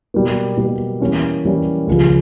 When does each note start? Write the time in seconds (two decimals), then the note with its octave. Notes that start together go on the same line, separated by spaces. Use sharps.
0.14 B2 G3 A#3
0.57 B2 G3 A#3
1.00 E3 G3 A#3 C#4 E4
1.44 E3 G3 A#3 C#4 E4
1.87 C#2 C#3 F3